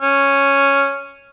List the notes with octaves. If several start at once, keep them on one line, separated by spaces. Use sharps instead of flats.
C#4